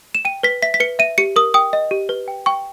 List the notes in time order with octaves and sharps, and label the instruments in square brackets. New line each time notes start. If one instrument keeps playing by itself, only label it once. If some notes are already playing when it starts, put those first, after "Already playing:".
[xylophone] E7
G5 D#7
B4 B6
E5 B6
B6
B4 C#7
E5 D#7
G4 C#7
A#4 D#6
G5 D#6
D#5
G4
B4
G5
G5 C#6